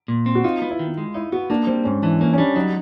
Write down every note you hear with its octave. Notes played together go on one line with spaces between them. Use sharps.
A#2
C4
F#4
D#4 F4
B3
E4
D#3
G#3
D#4 E4
B3 F#4
A#3 D4
G3 C4
G#2 C#4
E3 D4
A#3 C#4
C#4
G3 D4
F#3 D#4